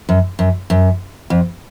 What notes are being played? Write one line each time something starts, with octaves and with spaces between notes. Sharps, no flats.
F#2
F#2
F#2
F2